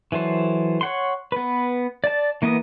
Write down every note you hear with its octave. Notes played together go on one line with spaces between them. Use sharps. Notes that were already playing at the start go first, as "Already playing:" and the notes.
E3 F#3 A4 C5
C#5 F#5 C6
B3 B4
D5 A5
E3 A#3 B3 D#5 D#6